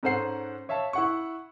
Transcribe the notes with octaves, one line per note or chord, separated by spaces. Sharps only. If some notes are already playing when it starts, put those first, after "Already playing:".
G#2 C#4 A4 C5 F#5 C7
C#5 E5 F5 A5
E4 F#5 C#6